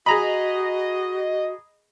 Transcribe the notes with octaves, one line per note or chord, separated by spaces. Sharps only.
F#4 G#4 D#5 A#5 B5